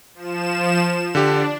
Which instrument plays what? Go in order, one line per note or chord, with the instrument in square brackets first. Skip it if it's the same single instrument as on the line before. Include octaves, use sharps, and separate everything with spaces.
[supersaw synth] F3 E7
[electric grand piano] D3 G4 [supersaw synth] D4